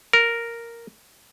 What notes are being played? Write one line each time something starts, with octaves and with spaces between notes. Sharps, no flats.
A#4